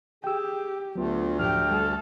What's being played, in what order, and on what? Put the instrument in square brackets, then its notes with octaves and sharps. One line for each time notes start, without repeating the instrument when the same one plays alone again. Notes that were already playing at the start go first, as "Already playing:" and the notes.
[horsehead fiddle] G4 [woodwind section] G#4 [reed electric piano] G5 E6
[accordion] D2 [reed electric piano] F#3 B3 [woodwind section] D4 F4
[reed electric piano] F#2 A2 F3 [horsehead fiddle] G4 G5 [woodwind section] F6
[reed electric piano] G3 A3 [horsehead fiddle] A4